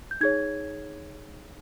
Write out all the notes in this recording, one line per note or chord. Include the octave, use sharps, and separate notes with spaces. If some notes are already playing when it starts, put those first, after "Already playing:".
G6
D#4 G#4 C#5 G#6